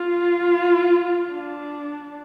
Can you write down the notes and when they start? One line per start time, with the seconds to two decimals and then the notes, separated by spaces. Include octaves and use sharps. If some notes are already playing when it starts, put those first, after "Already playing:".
Already playing: F4
1.31 D4